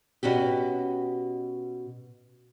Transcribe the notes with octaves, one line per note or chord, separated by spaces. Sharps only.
B2 C#4 F#4 G4